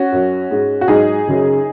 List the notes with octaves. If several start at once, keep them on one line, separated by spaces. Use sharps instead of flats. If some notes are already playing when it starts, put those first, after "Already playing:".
Already playing: C#4 F#4
F#2 F#3
G#2 G#3
F#4
G#2 F#3 D#4 G#4
F#2 C#3 F#3